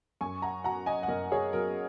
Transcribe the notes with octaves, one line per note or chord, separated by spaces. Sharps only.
F#2 G#5 C#6
F#5 A#5
F#3 F#5 A#5
D#5 G#5
F#5
F#2 A#4 D#5
G#4 C#5
F#3 A#4